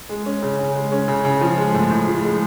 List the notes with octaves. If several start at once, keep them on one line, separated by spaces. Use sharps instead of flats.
G#3
C#4
C#3
C#3
G#3
C#4
C#3
C#3
F3
G#3
A2
A2
F3
G#3